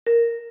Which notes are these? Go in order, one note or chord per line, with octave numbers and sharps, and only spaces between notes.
A#4